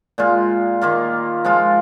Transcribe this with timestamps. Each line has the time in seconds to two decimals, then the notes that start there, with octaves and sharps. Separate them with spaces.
0.18 A#2 G#3 F4
0.81 D#3 A#3 F4
1.44 F3 G#3 F4